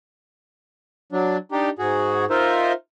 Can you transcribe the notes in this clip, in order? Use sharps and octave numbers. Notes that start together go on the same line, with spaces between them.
F#3 D4
D4 D#4 G4
G#2 F#4 G#4
D#4 F4 A#4 C5 E5